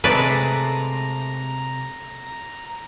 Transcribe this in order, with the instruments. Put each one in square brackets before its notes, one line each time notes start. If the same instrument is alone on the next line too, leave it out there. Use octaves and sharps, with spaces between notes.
[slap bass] C3 [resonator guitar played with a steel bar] G#3 A3 [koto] B4 D5 [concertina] A#5